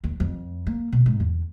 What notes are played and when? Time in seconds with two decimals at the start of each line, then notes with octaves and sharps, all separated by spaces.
0.04 D#2
0.20 F2
0.67 A#3
0.92 B2
1.06 G#2
1.20 E2